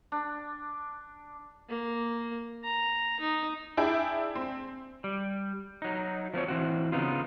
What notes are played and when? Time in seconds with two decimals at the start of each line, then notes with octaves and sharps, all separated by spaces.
0.12 D4
1.69 A#3
2.64 A#5
3.20 D#4
3.77 D4 E4 G#4 E5 G5
4.35 C4
5.04 G3
5.82 F#3 D#4
6.34 F3 A3 C4 C#5
6.48 E3 C4 F#4
6.92 C#3 B3 D#4 F4